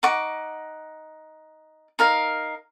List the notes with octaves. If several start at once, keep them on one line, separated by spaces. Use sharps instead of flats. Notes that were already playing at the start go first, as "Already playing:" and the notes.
D#4 F#5 C#6 D6
D#4 A#4 F5